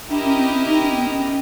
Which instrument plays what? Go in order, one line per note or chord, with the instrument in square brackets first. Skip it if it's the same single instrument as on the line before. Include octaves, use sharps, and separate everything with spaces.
[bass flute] D4 [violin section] E4 G4 A#4 D#5 G5
[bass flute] C#4
C4
C4
D#4
D4
C4
B3
C#4